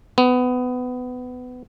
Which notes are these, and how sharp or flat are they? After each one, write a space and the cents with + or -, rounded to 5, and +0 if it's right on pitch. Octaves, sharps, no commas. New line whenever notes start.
B3 +20